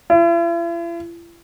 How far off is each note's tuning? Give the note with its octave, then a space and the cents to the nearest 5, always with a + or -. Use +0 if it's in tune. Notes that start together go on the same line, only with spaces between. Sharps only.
E4 +45